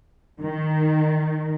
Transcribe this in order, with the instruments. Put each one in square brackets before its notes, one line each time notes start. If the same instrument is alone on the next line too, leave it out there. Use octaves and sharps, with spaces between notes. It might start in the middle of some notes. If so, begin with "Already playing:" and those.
[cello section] D#3